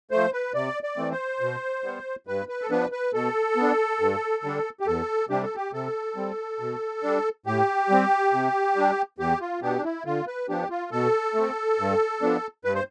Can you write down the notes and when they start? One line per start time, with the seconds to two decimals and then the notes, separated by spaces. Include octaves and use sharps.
0.11 F3 A3 C5
0.33 B4
0.54 C3 D5
0.83 D5
0.97 E3 A3 C4
1.12 C5
1.41 B2
1.84 G3 B3
2.27 G2 B4
2.49 B4
2.62 A4
2.70 F3 B3 D4 B4
2.92 B4
3.14 B2 A4
3.57 B3 D4
4.00 G2
4.44 D3 G3 D4
4.80 G4
4.86 E2 A4
5.29 C3 G3 D4 G4
5.43 A4
5.56 G4
5.73 C3 A4
6.16 G3 C4
6.60 B2
7.03 G3 D4
7.46 A2 G4
7.90 G3 C4
8.33 C3
8.76 G3 D4
9.19 E2 G4
9.41 F4
9.62 B2 B3 D4 G4
9.78 D4
9.84 E4
10.06 D3 F4
10.27 B4
10.49 F3 B3 D4 G4
10.70 F4
10.91 B2 A4
11.35 A3 C4
11.79 G2
12.22 F3 B3 D4
12.64 G2 B4
12.74 C5